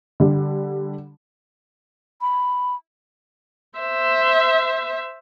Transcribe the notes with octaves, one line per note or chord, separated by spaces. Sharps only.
D3 G3
B5
C5 E5